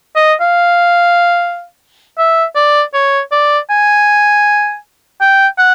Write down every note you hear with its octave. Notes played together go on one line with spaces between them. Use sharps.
D#5
F5
E5
D5
C#5
D5
G#5
G5
F#5